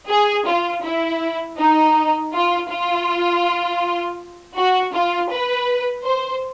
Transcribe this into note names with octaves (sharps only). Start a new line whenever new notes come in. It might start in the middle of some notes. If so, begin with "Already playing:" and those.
G#4
F4
E4
D#4
F4
F4
F#4
F4
B4
C5